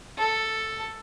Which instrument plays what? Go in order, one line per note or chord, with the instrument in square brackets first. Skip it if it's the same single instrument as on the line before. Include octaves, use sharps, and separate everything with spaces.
[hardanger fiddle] A4